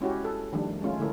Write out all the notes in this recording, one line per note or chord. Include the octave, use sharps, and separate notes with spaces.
G#3 C#4 E4 F#4 G4
A4
D#3 F3 G3 A3 D4
G#3 A3 C#4 F4
D3 A3 E4 A4 A#4